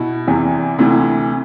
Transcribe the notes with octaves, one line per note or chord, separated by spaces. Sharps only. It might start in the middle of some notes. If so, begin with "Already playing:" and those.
Already playing: B2 E4
E2 C3 E3
D2 C3 E3